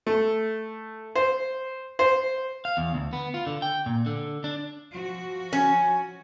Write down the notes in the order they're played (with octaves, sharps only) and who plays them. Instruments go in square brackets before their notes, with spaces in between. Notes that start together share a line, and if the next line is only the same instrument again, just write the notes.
[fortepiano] A3
C5
C5
[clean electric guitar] F5
E2
D2
B3
F4
D3
G5
A#2
D3
D4
[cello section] F3 F#4
[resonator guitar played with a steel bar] C#4